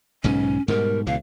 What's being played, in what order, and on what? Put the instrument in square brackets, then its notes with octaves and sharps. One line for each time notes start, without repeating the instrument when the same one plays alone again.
[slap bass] B1 G#2 C#3 [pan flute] C#4
[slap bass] G#2 B2 G3 [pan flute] A#4
[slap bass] C#2 B2 E3 [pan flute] F5